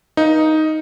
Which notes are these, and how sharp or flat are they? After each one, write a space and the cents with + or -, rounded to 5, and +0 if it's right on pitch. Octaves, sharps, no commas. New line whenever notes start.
D#4 +5 B4 -45 F5 +0